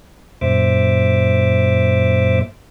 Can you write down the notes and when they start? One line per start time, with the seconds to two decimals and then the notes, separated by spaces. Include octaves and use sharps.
0.41 F#2 A#2 C5 E5 D6